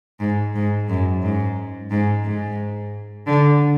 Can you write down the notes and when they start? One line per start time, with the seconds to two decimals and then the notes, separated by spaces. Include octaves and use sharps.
0.20 G#2
0.55 G#2
0.89 F#2
1.23 G#2
1.91 G#2
2.25 G#2
3.27 D3